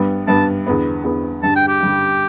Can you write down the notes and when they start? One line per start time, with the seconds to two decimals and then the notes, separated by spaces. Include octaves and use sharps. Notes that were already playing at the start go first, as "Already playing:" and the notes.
Already playing: G2 G3 B3
0.28 G2 G3 B3 A5
0.67 E2 D3 B3
1.04 E2 D3 B3
1.43 G2 D3 G3 A5
1.56 G5
1.68 G4
1.80 G2 D3 G3